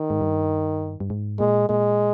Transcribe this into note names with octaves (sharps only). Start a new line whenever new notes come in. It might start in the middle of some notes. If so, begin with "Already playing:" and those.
Already playing: D#3
G#2
G2
G2
G#2
A#2 G#3
A#2 G#3